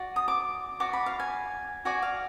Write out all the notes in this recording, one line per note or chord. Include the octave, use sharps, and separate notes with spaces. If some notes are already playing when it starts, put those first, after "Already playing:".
Already playing: F#4 D5
D#6
D6
F#4 D5 D6
B5
F5
G#5
F#4 D5 G#5
F5